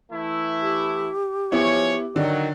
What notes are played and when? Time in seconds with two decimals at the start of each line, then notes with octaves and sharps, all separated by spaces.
0.11 E3 A3 E4
0.61 G4
1.52 F3 B3 E4 G#4 C#5
2.16 D3 D#3 F#3